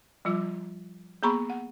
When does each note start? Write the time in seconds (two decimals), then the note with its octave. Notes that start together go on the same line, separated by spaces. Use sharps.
0.25 F3 G3 F4 D6
1.23 A#3 B3 G#4 A#5 B5 C#6
1.50 F#5